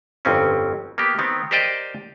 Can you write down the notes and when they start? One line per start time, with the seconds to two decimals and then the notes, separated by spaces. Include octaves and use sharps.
0.25 G1 F2 C4 C#4
0.98 A#3 B3 G4
1.19 D#3 B3 C4
1.51 G4 A#4 C5 D5 D#5 G5